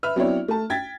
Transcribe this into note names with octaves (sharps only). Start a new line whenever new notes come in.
B4 E5 F6
F#3 B3 C4 D4 E4 C#5
A3 A5
G5 G#6 A6 B6